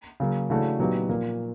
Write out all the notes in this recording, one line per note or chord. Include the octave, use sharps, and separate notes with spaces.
C#3 F#3 A#3
C#3 E3 A3 D4 F#4
A#2 F#3 B3 D#4 G4
A#2 F3 A#3